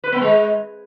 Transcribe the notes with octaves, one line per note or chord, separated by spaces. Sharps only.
B4
B3
G#3